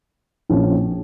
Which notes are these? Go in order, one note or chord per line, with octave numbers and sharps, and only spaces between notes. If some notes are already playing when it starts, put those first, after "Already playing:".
A#1 A#2 F3 C#4